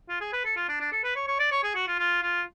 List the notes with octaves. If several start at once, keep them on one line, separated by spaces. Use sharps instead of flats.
F4
G#4
B4
A4
F4
D4
D4
A4
B4
C#5
C#5
D5
C#5
G#4
F#4
F4
F4
F4